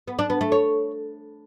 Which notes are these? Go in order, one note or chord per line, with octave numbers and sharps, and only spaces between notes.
B3
D4
B3
A3
C#5